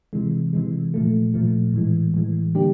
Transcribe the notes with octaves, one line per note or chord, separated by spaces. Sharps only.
C3 E3 G#3
C3 E3 G#3
A#2 F3 A3
A#2 F3 A3
A2 E3 G#3
A2 E3 G#3
D3 G3 A#3 D4 G4